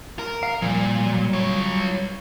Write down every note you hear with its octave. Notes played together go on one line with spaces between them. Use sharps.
A#4
F5
A#2 F3 G3
F#3 G3
F4 C#5